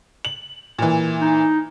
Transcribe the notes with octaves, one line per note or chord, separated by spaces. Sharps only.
F#7
A#2 E3
D#4